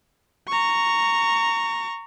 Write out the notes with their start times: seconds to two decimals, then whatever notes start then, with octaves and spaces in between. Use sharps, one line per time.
0.48 A#5 C#6